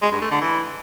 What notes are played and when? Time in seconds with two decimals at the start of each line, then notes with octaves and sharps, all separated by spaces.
0.02 G#3
0.12 G2
0.22 A3
0.31 D3
0.41 E3